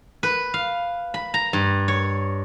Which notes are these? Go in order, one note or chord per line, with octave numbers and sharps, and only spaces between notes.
B4
F5
B5
A#5
G2
C#5